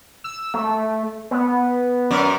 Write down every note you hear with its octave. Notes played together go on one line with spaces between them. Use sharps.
E6
A3
B3
F#2 A#4 D5